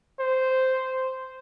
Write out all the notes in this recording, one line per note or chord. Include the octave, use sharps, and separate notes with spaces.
C5